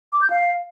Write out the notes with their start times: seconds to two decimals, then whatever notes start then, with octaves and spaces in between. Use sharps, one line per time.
0.12 D6
0.21 G6
0.30 F5